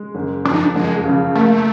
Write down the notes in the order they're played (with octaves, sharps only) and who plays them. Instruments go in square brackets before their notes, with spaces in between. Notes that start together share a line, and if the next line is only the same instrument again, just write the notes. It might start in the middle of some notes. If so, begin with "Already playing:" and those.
Already playing: [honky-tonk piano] G#3
F#1
[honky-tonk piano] F2 [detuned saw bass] D4
[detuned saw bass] D#4
D4
[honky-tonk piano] F#1 [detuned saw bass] G#3
[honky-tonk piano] C#3
[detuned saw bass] A3 [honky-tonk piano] A#3